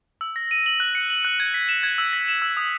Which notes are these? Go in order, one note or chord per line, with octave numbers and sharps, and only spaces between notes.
E6
A#6
D#7
F#7
F#6
C#7
F#7
F#6
G#6
B6
E7
G#6
E6
B6
E7
E6
D#6